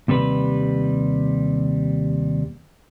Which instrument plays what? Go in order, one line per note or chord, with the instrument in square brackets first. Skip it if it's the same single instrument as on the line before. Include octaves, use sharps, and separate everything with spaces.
[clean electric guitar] D#2 C3 G3 B4